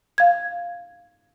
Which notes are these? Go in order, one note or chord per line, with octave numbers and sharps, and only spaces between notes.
F5 G#6